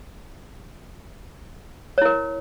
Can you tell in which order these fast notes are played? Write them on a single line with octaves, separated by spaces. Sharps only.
C#5 E4 A#4